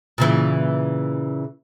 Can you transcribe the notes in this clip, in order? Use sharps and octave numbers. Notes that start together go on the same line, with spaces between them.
A#2 C#3 E3